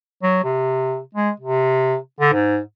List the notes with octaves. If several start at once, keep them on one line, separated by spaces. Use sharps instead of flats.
F#3
C3
G#3
C3
D3
G#2